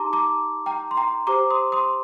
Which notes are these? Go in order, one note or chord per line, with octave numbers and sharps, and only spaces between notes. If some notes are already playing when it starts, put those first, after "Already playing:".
Already playing: D#4 G4 A5 A#5 C6 D6
A#5 D6
G5 A#5
C6
G5 A#5
G4 C5 A#5 D6
C6 D#6
C6 D#6